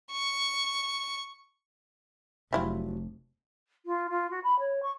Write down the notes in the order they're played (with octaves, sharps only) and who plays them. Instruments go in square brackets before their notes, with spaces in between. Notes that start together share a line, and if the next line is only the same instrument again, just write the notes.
[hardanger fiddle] C#6
[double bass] F1 [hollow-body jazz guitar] F#3 E5 [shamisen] G3 E4 F4
[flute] F4
F4
F#4
B5
C#5
C#6